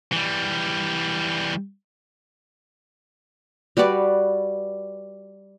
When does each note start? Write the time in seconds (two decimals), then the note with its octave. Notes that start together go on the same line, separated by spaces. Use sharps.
0.12 E3 G3
3.77 G3 F#4 B4 D5